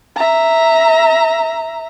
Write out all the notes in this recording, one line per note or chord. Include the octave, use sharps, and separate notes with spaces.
E5 A#5